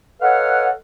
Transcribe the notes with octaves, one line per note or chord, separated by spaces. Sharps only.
A4 B4 C#5 D#5 F5 F#5